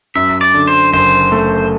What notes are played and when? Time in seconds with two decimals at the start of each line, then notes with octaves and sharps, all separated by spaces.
0.15 F#2 E5
0.41 D5
0.54 D3
0.67 C5
0.93 F#1 C5
1.32 A3